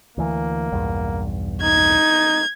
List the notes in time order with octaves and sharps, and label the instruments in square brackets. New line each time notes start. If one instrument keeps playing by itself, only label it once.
[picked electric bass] D2 E3 [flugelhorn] A#3
[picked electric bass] B1 E2 G2
[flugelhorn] D#4 [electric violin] G#6